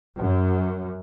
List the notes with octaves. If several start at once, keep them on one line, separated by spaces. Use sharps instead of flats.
F#2